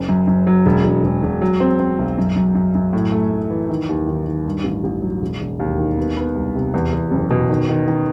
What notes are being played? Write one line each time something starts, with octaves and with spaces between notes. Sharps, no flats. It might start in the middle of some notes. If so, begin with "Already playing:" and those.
Already playing: F#1
F#2
F#2
F#3
E1
E1
E1
E1
F#3
C4
C4
B1
F#2
F#2
F#2
F#2
A2
A3
A2
E3
D#3
D#2
D#3
D#3
G2
A1
A1
F#3
E1
E1
D#2
D#3
B3
B3
C2
C3
E2
E2
F#1
B2
D#3
D#3
D#3